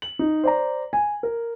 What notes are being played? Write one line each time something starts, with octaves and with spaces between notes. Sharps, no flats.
F#7
D#4
C5 D5 A#5
G#5
A#4